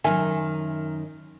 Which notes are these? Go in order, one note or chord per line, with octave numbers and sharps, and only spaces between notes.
F#2 D#3 E5 G#5